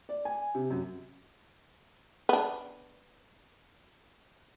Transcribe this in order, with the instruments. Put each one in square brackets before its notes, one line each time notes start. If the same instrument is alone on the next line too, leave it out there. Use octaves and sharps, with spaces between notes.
[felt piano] D5
G#5
C3
F#2
[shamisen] B3 D4